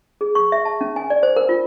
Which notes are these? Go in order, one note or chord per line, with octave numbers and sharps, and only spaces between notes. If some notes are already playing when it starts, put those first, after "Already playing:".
G#4
C#6
E5
A5
C#4
G#5
D5
C5
A#4
F4